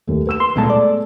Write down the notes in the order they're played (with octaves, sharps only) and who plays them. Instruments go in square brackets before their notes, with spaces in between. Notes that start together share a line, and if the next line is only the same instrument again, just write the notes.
[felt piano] D#2 A3
B4 E6 E7
[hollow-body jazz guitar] C6
[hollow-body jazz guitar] C#2 A#2 A5 [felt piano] G#3 A3 B3
[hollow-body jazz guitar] D5